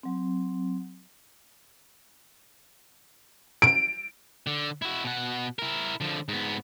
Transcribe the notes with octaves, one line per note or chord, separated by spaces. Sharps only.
F#3 C4
D7
D3
E4 F#4
B2 F#5
E4 A#4
D3 F3
G#2 B3